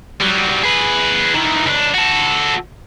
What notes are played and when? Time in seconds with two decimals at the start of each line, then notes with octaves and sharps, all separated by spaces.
0.21 F#3 G3
0.63 G#4 B4
1.34 D#3 E3
1.66 C#2 D4
1.94 F#4 A4